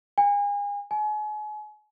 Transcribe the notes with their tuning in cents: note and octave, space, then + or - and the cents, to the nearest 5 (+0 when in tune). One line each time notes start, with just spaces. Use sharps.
G#5 -35
G#5 +35